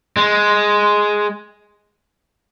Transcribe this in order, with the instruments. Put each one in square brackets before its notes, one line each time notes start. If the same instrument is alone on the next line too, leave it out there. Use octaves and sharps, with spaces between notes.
[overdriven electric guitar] G#3